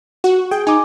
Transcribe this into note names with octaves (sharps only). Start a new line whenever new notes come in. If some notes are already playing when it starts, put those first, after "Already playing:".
F#4
G#4 G5
D#4 G#5 D6